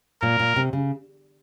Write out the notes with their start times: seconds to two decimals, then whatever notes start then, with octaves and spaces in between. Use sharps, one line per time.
0.22 A#2 A#4
0.39 A#2
0.56 C3
0.73 C#3